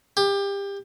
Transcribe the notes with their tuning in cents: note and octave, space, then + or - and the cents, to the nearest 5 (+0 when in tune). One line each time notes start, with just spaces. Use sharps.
G4 +25